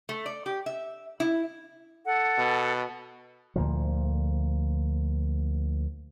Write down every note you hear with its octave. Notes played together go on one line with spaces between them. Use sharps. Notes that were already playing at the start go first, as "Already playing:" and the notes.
A3
D5
G4
E5
E4
A4 F#5
B2
D2 A#2 F3